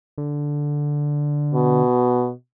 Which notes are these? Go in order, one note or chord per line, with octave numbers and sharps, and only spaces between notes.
D3
B2